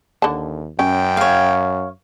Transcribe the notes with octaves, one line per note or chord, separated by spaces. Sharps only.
D#2 D3 A5
F#2 C#4 G5
C#5 F5